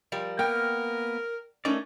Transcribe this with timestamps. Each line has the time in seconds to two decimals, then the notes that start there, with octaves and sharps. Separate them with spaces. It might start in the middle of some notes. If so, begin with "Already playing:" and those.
0.12 F3 G3 A#4
0.39 A#3 B3 A#4 G5 F6
1.65 A3 C#4 D#4 A#4 D5